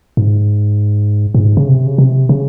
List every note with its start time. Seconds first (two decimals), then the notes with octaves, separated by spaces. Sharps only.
0.17 G#2
1.34 A#2
1.38 G#2
1.57 C#3
1.68 C3
1.87 C#3
1.98 C3
2.29 C#3